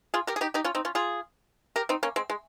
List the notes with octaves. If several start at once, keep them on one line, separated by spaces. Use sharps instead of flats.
F4 G#4
G4 A#4
G#4
D#4 G4
D#4 G4
C#4 F4
C4 D#4
C#4 F4
F4 G#4
G4 A#4
C4 D#4
A#3 C#4
G#3 C4
G#3